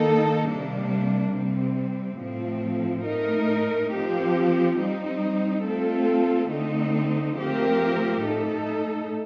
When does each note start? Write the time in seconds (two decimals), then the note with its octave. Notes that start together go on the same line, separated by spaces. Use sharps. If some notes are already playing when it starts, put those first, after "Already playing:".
Already playing: D#3 A#3 D#4 A4
0.48 C3 G3 A#3 D4
1.34 C3 G3 C4
2.19 A2 F3 A3 C4
3.06 A2 A3 D#4 A#4
3.93 F3 C4 G4
4.78 G3 C4 D#4
5.65 A3 C4 F4 A4
6.51 D3 A3 C4 D#4
7.37 F3 A3 C4 G4 A#4
8.23 A2 A3 D#4 A4